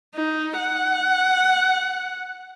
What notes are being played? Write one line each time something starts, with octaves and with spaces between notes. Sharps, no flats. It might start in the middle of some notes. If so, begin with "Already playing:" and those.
D#4
F#5